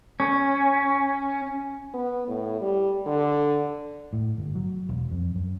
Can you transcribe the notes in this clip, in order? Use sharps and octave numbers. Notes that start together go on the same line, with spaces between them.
C#4
B3
A2
G3
D3
A2
G1
F#3
E1
F2
F#2